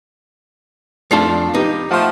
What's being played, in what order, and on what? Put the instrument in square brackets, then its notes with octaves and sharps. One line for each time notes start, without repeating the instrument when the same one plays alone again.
[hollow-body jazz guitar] F2 F4 A5 [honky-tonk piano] A3 D4 C7
[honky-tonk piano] B3 G4 D6 [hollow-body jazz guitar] D#4
[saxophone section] F3 A3 [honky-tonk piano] F#5 C6